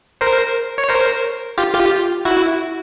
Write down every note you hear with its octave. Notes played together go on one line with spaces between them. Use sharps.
A#4 C5
C#5
A#4 C5
F4 G4
F4 G4
E4 F#4